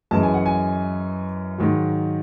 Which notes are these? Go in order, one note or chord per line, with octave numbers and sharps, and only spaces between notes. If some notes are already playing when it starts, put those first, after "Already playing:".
F#2 E3 G#3 A5
G#5
F#5
G#5
G#2 D#3 F#3